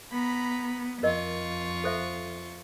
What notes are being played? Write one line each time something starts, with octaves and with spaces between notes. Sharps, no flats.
B3 A#5 B5
F2 F4 A#4 D#5 C#6
A4 C5 E5